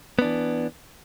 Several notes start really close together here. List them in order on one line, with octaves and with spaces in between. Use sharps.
B3 D4 E3